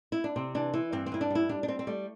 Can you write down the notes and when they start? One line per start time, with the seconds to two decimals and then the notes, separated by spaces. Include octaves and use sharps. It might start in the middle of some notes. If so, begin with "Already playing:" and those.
0.12 E4
0.24 D4
0.36 C3 C4
0.55 E3 D4
0.73 E3 E4
0.92 G2 C4
1.06 C4
1.12 G2 E4
1.21 D4
1.31 G3 E4
1.49 G3 D4
1.63 D4
1.68 G3 C4
1.79 C4
1.87 G3 A3